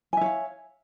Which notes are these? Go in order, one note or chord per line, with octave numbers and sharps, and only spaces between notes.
C#5 E5 F5 G#5